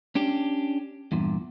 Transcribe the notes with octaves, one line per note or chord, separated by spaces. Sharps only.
C#4 D4 G4
E2 G2 A#2